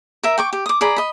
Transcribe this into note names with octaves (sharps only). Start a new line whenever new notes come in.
A#4 E5
G5 C#6 D6
G4
D6 D#6
G#4 D5 A#5 B5
D#5 B5